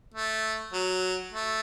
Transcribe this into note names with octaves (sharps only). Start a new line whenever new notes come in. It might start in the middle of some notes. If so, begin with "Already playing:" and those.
A3
F#3
A3